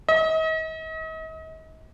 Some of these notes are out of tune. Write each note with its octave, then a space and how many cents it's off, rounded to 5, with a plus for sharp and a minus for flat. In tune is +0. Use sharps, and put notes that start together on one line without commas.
D#5 +40